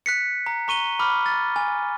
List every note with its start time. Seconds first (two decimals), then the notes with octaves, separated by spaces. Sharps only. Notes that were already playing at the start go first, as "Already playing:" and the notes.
0.06 F#6 B6 C#7
0.46 A#5
0.68 A#5 C#6 D#7 G7
0.99 B5 D6 F6
1.26 A6
1.56 G#5